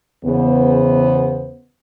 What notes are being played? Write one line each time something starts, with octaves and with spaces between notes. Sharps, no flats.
E2 C#3 B3 C5